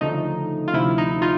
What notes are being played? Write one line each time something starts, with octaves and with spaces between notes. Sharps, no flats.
D2 C#3 F3 A3 D#4
F4
D2 C3 F3 E4
D#4
D#4 F4